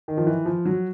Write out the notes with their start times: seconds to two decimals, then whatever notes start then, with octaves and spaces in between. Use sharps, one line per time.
0.08 D#3
0.17 F3
0.27 E3
0.46 F3
0.65 F#3